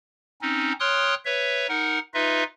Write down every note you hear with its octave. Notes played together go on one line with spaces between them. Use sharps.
C4 C#4 D#4
C#5 G5 C6 D#6 F6 F#6
B4 C#5 E5
D#4 A#4 F#5
D#4 F4 B4 D#5 E5